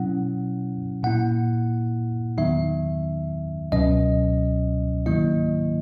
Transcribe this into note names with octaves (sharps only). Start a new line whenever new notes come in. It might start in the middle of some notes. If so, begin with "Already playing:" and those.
Already playing: B2 F#3 C#4 E4 F#5
A#2 A#3 E4 F#5
E2 D#3 F#3 B3 D#4 E5
C#2 B2 F#3 C#4 D#5
G#2 D#3 F#3 A#3 E4 D#5